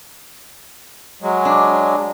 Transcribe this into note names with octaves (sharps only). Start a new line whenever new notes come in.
F#3 G#3
D4